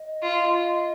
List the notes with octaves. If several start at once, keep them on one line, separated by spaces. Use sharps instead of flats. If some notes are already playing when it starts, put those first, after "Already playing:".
Already playing: D#5
F4